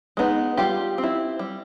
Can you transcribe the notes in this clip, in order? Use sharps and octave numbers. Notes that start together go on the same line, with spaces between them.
G#3 B3 D#4
G3 F4 G4
C4
E4
G3